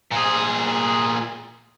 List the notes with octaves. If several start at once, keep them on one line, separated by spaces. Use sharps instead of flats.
A#2 G#4